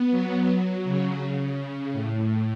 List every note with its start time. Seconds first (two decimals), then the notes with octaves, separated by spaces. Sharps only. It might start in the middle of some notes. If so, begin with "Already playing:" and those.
Already playing: B3
0.11 F#3
0.84 C#3
1.20 C#3
1.92 A2